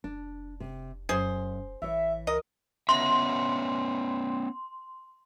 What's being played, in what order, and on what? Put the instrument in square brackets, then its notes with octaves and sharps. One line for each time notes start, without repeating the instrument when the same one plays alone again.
[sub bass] F1 [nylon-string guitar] D4
[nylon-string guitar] C3
[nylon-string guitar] F#2 [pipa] G#4 C5
[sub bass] A1 [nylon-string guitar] E3 C#5 [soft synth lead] E5
[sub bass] C#2 [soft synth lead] A#4 [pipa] D#5
[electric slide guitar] B3 C#4 E5 [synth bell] C6